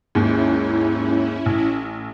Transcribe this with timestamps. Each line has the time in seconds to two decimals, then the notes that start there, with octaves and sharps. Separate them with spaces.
0.15 D#2 G#2 C#4 E4
1.46 A1